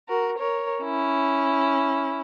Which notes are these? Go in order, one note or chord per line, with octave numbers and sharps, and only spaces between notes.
F#4 A#4
A#4 C#5
C#4 E4